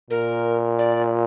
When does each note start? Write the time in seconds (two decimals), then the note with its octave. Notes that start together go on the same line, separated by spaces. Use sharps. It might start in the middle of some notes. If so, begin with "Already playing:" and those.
0.10 A#2 A#4
0.79 D5